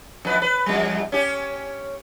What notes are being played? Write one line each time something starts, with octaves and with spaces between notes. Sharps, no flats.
E2 B4
B4
E2 G3
C#4 G4